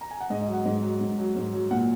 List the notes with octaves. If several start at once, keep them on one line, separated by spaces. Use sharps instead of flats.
A#5
G#5
F#5
G#2 D#5
D#5
F#3
F#5
G#2 D#5
F#3
G#2
F#3
G#2
F#3
A#2 F#5